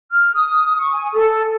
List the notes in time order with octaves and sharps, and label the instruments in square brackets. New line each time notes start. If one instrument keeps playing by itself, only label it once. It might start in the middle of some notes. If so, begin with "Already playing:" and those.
[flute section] F6
D#6
C#6
G#5
A4